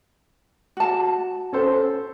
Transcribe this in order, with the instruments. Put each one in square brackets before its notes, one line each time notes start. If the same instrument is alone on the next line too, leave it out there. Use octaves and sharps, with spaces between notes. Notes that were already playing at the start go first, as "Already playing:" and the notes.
[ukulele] F#4 A5
[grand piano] C#4 A4 C5